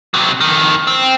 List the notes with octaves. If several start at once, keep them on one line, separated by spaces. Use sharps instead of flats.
C3 F#3
F2 D#3
C4